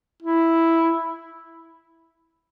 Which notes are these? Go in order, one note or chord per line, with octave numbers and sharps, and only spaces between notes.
E4